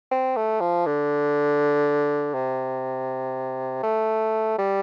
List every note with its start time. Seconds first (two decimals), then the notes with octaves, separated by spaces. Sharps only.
0.12 C4
0.37 A3
0.61 F3
0.86 D3
2.34 C3
3.83 A3
4.59 G3